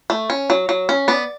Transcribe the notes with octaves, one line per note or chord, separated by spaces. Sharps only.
A3
C#4
F#3
F#3
C#4
B3 D5